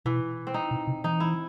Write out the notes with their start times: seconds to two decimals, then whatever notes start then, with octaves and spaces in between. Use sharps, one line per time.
0.05 B2 E3
0.47 C4
0.54 D#4
0.71 B2
0.87 C3
1.04 E3 D#4
1.20 E4